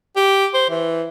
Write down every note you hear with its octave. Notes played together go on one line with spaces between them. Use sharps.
G4
C5
E3